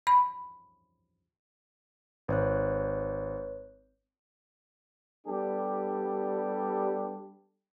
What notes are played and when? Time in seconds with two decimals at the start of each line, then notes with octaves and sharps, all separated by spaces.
0.07 B5
2.28 G#1 B4 C#5 F#6
5.26 G3 B3 D4 G4 A4